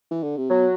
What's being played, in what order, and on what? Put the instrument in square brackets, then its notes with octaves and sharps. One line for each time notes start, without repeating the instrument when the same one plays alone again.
[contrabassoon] E3
D3
C3
[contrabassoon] B2 [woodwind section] F#3